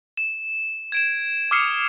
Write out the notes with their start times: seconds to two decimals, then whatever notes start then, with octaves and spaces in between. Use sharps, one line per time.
0.17 E7
0.92 G#6 D7 E7
1.51 D6 D#6 F6 C7 C#7